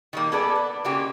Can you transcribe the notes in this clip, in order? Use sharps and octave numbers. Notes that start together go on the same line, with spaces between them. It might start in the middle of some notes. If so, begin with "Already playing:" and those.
D#3 G3 A#3
B3 G#4 A4 B4 D5
B3
C#3 G#3 A#3 F#4 G4